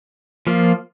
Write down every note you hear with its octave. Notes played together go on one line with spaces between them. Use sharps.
F3 A#3 F4